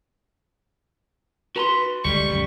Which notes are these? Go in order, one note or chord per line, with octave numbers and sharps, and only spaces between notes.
F#4 B4 A#5 C6
D2 D3 G3 G#3 C#6
C#2 F#2